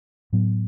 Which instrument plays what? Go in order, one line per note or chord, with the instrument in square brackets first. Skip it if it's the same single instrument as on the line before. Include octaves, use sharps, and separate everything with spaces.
[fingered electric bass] A2 F#3 B3